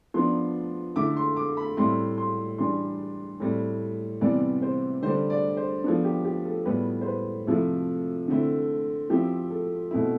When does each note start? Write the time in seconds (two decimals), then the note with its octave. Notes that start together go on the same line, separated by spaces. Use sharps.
0.14 F3 B3 D4 C6
0.96 D3 A3 E4 D6
1.17 C6
1.36 D6
1.57 B5
1.77 A2 G3 C4 E4 C6
2.18 C6
2.58 E3 G3 D4 C6
3.40 A2 G3 C4
4.21 C3 E3 G3 B3 D5
4.62 C5
5.03 D3 G3 D4 C5
5.30 D5
5.57 C5
5.84 F3 B3 D4 A4
6.04 G4
6.25 G4
6.45 A4
6.65 A2 G3 B3 B4
7.01 C5
7.06 B4
7.47 C3 F3 A3 E4 A4
8.28 D3 A3 C4 E4
9.10 F3 C4 E4 G4
9.50 A4
9.91 B2 A3 C4 E4